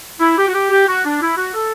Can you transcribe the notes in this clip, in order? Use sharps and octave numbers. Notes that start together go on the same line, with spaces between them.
E4
G4
F#4
G4
G4
F#4
D4
E4
F#4
A4